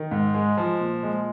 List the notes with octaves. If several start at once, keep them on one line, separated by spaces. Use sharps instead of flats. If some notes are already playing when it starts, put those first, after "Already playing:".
Already playing: D#3
G#2
G#3
F3
A#2
G#3